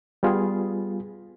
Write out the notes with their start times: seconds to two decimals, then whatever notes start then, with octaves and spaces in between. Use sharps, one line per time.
0.23 G3 B3 F4 G#4